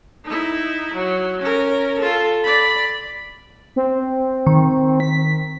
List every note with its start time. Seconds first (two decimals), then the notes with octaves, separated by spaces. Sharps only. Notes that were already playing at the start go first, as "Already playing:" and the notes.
0.25 D#4 E4
0.94 F#3
1.41 C#4 A#4
1.99 F4 A4
2.44 D5 B5
3.76 C4
4.47 D#3
5.00 B6